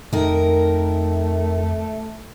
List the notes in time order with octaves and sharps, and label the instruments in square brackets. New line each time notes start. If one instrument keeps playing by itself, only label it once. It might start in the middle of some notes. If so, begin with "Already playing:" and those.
[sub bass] F2 [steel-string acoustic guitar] D#3 A#4 [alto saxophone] A3